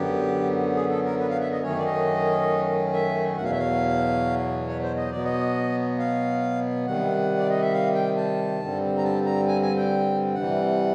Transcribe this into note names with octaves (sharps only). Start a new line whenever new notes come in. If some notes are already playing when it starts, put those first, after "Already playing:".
Already playing: F#2 D3 F#3 B3 G4
G#4
A4
A#4
B4
F5
E5
D#5
F#2 D#3 F#3 A3 C#4 C#5
D5
D#5
E5
E2 B2 F#3 F#5
F5
E5
F5
C#5
C5
D#5
B2 F#3 B3 D5
D#5
F5
C3 D#3 G3 F#5
D5
D#5
E5
F5
G5
A5
G2 D3 G3 C4
A#5
A5
A#5
G#5
G#5
G5
C3 E3 G3 F#5